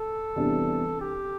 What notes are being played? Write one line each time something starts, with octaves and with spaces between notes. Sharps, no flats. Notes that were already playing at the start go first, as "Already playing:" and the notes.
Already playing: A4
E2 C3 G3 B3 D4
G4